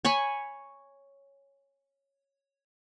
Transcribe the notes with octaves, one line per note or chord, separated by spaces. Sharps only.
C#5 G#5 B5 C#6